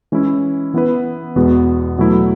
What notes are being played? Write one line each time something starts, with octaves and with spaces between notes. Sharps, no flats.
E3 G#3 C#4 E4
E3 B3 E4 B4
E2 B2 G#3 B3 F#4
B2 F#3 A3 E4